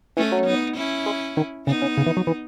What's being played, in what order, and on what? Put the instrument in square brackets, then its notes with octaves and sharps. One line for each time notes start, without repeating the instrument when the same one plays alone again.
[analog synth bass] E3 [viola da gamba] A3 C#4
[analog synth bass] F#3
[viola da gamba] B3 D#4
C#4 E4
[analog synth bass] G#3
D#3
[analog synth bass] C#3 [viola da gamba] B3 D#4
[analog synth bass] C#3
C#3
E3
F#3
E3